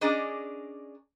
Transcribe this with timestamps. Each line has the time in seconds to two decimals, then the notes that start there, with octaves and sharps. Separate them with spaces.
0.01 C#4 D4 G#4 A#4 D5 D#5